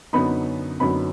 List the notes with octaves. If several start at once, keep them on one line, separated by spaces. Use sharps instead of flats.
F#2 D3 F#3 B3 D#4 B5
F#2 D3 F#3 B3 D#4 B5